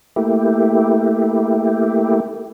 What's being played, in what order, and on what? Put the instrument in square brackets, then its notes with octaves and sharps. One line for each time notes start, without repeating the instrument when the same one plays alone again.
[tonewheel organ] A3 A#3 E4 G4